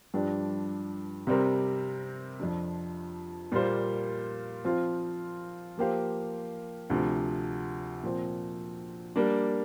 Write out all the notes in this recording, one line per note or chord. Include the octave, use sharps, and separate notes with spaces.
G2 F3 D4 G4
C3 G3 C4 A#4
F2 F3 D4
A#2 G3 A#3 F4 C5
F3 C4 F4
F3 A#3 G4 C5 F5
D2 C3 F3
A#2 F3 C4
G3 A#3 D4